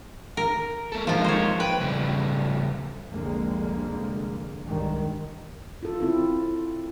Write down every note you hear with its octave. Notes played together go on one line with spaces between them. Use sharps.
A#4
A#3 A4
F3 G#3 A#3 D#4 F4
C5 C#5
B4 G5
C#3 G3 A3
C2 F2 D3 G#3 A#3
C2 G2 D#3 G#3
F4 A4
C4 E4 F4 A4